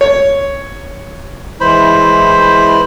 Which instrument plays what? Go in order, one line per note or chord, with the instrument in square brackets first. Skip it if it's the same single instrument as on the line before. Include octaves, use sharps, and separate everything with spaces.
[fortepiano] C#5
[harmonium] E3 G#3 E4 [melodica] C5 B5